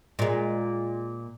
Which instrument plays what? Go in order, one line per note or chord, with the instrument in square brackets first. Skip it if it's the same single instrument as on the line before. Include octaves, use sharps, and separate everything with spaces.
[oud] A#2 G#3